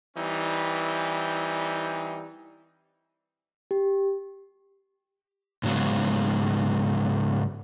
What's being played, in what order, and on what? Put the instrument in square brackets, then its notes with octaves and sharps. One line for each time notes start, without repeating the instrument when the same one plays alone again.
[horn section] E3 G3 C4 D#4
[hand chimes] G4
[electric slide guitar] G#2 C#3 F#3 G#3 B3